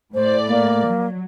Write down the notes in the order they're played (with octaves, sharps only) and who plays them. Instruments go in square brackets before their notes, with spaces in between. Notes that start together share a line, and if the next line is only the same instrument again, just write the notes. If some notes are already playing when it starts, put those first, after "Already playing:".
[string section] A2 D5 [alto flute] C5
[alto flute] A#3
[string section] F#3